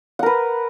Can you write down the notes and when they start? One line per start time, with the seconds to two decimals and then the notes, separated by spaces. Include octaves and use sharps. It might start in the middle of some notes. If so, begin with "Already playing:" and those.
0.19 F#5
0.23 A#4
0.26 B4